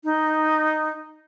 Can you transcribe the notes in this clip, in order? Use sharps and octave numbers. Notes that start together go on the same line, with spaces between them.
D#4